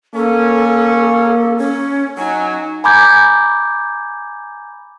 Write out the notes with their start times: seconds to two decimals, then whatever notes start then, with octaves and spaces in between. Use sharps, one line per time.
0.15 A#3 C#4 A4
1.58 C#4
2.18 F#3 D#4 G#5
2.84 G#5 A#5 B5 D6 G6 G#6